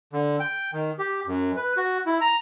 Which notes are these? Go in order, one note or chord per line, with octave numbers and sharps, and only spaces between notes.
D3
G5
D#3
G4
F#2
B4
F#4
E4
A#5